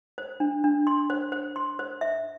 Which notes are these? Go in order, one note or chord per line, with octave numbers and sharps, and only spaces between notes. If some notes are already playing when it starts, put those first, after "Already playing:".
C5
D4
D4
C6
C5
C5
C6
C5
E5